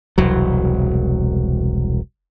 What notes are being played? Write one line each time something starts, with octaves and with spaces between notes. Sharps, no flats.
E1 C2 F#3